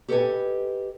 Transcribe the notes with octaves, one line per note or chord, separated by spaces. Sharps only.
G4 A4 B4 D#5 G5 G#5